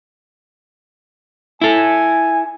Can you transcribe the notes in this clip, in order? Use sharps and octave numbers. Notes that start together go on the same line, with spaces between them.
E4 A4 G#5